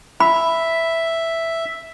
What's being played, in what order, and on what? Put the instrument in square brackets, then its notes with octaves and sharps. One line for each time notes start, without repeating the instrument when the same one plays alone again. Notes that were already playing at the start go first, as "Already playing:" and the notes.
[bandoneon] E5 [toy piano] B5